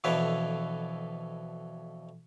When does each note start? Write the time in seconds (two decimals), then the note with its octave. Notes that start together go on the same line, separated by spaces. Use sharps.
0.04 F2 B2 D3 E3 B4 C#5